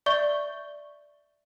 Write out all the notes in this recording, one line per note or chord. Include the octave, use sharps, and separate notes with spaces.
D5 E5 C#6 G6 G7